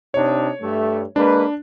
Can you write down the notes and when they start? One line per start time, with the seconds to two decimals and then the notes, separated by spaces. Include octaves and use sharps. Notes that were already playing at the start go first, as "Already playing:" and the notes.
0.14 C3 D4 D#4 C#5
0.61 G2 G3 A3
1.16 G#3 A#3 D4 B4